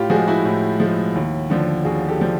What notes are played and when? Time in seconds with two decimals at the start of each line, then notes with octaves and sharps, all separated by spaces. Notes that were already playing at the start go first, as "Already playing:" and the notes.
Already playing: A2 F4 G4
0.10 F3 G#3 F#4 G#4
0.28 E4 F#4
0.45 A2
0.80 F3 G#3
1.15 D#2
1.50 D3 F3
1.85 D#2 F#4 G#4
2.08 G4 A4
2.20 D3 F3